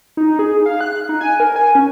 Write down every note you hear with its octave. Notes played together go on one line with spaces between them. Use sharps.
D#4
G#4
F5
F#6
D#4
G#5
A#4
G#5
C#4